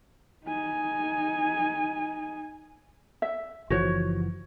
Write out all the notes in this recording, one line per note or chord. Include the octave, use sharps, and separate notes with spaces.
D#4 G#5
E5
F#1 E3 F3 F#4 C5 C#5